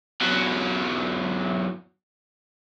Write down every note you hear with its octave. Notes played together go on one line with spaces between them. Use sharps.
E2 F#3